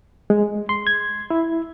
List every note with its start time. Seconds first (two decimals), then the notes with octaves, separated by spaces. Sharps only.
0.30 G#3
0.69 C6
0.87 G#6
1.30 E4